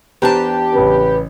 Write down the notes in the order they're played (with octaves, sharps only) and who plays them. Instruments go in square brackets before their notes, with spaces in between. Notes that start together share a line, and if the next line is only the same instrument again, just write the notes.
[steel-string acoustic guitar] E2 D4 A5 [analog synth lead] G4 [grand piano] B4 C5 A#5
[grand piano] A1 C#3 [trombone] B4